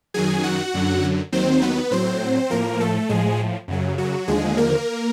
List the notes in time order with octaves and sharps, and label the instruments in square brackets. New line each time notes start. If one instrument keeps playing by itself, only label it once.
[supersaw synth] F#2 D#3 F#3 G#4 G#5
F#4 F#5
F#2 D3 F#3
D#2 D#3 F#3 C4 C5
B3 B4
A2 F#3 C4 C5
A2 F3 A#3 A#4
A3 A4
A2 F3 G#3 G#4
F#2 C#3 F#3
F#3 F#4
D#2 D3 F3 G#3 G#4
A#3 A#4